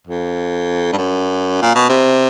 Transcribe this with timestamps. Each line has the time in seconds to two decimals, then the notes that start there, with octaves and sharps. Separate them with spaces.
0.07 F2
0.92 G2
0.97 F#2
1.62 A#2
1.75 B2
1.89 C3